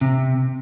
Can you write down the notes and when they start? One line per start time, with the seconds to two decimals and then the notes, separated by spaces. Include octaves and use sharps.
0.01 C3